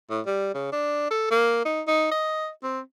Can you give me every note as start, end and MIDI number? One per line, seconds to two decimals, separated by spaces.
0.10 0.21 45
0.26 0.53 55
0.54 0.71 49
0.72 1.08 62
1.11 1.29 69
1.31 1.61 58
1.65 1.82 63
1.87 2.08 63
2.11 2.49 75
2.63 2.80 60